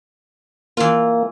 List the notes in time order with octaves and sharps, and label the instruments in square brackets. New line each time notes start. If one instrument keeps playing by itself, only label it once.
[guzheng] E3 F4 [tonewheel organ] A#3